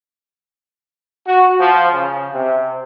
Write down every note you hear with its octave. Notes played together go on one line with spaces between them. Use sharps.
F#4
F3
C#3
C3